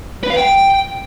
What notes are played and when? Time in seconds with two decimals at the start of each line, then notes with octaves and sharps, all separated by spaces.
0.23 B4
0.30 F5
0.37 G5